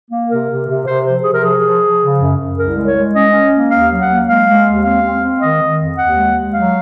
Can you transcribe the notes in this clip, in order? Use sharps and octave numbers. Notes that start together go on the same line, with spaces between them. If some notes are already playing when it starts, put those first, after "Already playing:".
A#3
C3 A#4
C3
C3
C3 C5
F3 C5
C3 G#4
A#4
F3 G#4
F3
F3
C#3
F#2
F#2
C2 A#4
G#3
C#5
G#3
C#4 D#5
C#4
A#3
D#2 F5
F#3
F#5
A#3
G#3 F5
G#3
D#2
C4 F5
C4
C4
D#3 D#5
D#3
F2
D#2 F#5
G#3
G#3
F#3 F5